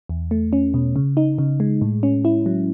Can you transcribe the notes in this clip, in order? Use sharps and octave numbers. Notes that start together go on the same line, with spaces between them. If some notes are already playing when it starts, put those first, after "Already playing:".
E2
A3
C#4
B2
C#3
D#4
C#3
G#3
A2
C#4
E4
F#3